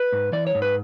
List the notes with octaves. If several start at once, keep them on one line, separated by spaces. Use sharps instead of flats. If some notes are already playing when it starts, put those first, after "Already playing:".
Already playing: B4
G#2
E3 D5
C#5
G#2
B4